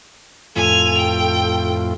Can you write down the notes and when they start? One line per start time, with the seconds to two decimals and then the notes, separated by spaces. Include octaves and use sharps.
0.56 F2 A2 F4 A4 G#5 F7
0.98 G5